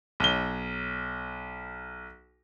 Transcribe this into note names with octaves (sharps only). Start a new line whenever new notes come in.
B1 G7